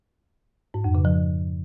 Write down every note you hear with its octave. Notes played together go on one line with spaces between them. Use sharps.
G#2
F2
C#3
F3